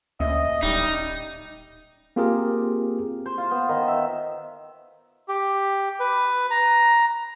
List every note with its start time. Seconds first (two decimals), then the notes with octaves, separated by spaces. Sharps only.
0.20 D2 A#2 C#4 D#5 E5
0.63 D1 G3 D#4
2.16 A#3 C4 F4 G4 G#4 A#4
3.26 C5
3.38 F4
3.51 B3
3.69 D#3
3.88 E5
5.28 G4
6.00 B4
6.51 A#5